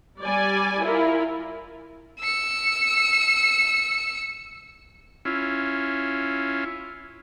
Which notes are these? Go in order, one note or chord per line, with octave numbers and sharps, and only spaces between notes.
G3 D5 G#5
E4 F4 A#4
E6 C#7
C#4 E4 F4